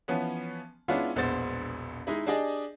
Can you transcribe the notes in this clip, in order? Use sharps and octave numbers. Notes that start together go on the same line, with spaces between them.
E3 F3 B3 C#4
G#3 B3 C#4 D4 E4 F4
E1 A#1 G#3 B3 C5 A6
G#3 D#4 E4
D4 G4 G#4 D5 D#5